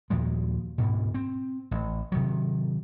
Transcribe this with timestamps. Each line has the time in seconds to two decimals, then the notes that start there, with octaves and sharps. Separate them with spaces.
0.10 D#2 A#2 F3 G#3
0.78 D2 G#2 B2
1.14 C4
1.71 A1
2.12 C3 D#3 F#3